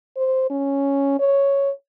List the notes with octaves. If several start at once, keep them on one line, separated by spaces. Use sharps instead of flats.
C5
C#4
C#5